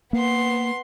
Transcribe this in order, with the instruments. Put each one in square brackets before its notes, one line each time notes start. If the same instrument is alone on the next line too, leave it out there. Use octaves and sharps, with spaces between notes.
[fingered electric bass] A#3 [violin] B3 C6